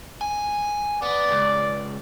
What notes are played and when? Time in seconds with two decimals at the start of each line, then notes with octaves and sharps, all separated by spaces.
0.21 G#5
1.02 B3 D5
1.31 C#2